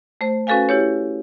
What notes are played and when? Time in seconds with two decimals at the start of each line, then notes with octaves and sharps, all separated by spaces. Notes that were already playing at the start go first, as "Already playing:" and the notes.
0.21 A3 C5
0.47 C#4 F#4 A4 B4 F5 G#5
0.69 E4 G4 C#5